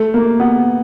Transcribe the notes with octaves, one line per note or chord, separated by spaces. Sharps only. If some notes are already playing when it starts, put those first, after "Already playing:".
Already playing: A3
A#3
B3